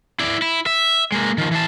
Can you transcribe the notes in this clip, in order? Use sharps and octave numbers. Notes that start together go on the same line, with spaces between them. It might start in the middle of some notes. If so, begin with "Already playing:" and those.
E4 D5
E4
E5
G#3 A#3
D#3 F3
E3 A5